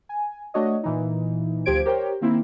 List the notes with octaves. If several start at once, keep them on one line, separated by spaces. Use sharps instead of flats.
G#5
A3 D4 F#4 C#5 D#5
A#2 E3 D#4
D2 F3 G4 C5 G#6 D7
G4 A#4 C5 C#5 G5
D#3 A#3 C4 E4